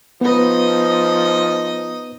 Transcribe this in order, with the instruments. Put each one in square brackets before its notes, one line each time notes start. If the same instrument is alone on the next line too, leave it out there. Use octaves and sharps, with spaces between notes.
[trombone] F3 [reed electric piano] B3 B4 [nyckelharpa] D#4 D#5